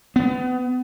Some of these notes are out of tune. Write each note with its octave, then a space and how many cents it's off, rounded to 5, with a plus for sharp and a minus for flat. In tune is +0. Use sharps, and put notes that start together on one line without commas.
B3 +30